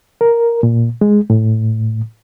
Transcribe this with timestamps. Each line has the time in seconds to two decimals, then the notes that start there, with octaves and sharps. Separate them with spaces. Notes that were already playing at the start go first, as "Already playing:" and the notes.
0.21 A#4
0.63 A#2
1.01 G#3
1.30 A2